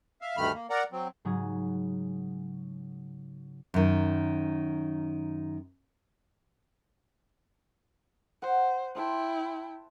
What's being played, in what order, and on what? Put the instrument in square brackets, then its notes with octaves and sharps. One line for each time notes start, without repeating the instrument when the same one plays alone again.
[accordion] E5 F5
D2 G2 D#3 A3 B5 F6
A#3
A#4 D5 F#5 A#5
F#3 C4
[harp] G#2 C#3 F#3 G#4
[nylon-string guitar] F#2 D#3
[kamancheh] C5 [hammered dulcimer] F#5
[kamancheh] E4 G5 [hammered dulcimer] C5 E5 A5